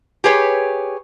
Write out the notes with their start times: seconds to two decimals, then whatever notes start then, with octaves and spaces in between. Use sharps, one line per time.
0.24 G4 G#4 B4 C#5